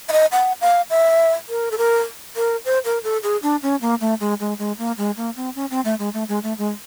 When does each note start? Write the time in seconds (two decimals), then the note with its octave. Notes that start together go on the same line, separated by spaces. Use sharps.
0.09 E5
0.12 D#5
0.32 F#5
0.61 F5
0.90 E5
1.49 A#4
1.71 A4
1.78 A#4
2.36 A#4
2.65 C5
2.85 A#4
3.04 A4
3.23 G#4
3.43 D4
3.62 C#4
3.81 A#3
4.01 A3
4.20 G#3
4.40 G#3
4.59 G#3
4.78 A#3
4.98 G#3
5.17 A#3
5.36 C4
5.56 C#4
5.71 C4
5.85 A3
5.99 G#3
6.14 A3
6.29 G#3
6.43 A3
6.58 G#3